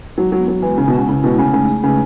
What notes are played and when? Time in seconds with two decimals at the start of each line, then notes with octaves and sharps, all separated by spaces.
0.18 F#3 G#3
0.32 F#3 B3
0.47 F#3 F#4
0.62 E3 G#3
0.78 C#3 G#3
0.88 B2
0.93 C#3 C#4
1.08 C#3 E4
1.23 B2 G#3
1.38 C#3 A3
1.53 C#3 D#4
1.69 G#4
1.83 C#3 B4